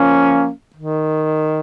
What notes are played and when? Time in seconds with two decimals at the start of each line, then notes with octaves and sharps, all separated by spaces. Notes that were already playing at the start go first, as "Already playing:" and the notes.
Already playing: F3 A#3 C#4
0.76 D#3